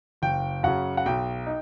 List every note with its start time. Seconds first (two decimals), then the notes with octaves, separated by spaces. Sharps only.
0.22 F#1 G5
0.63 F#2 C#3 F#5
0.97 F#5
1.06 B1 G5
1.47 D#4